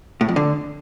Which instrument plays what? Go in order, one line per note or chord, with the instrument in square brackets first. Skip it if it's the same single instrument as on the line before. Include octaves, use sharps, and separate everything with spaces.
[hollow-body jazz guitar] A2
F2
D3